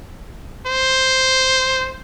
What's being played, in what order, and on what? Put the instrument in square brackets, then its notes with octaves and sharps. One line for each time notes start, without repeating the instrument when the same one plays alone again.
[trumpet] C5